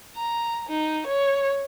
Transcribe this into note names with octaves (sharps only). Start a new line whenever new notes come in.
A#5
D#4
C#5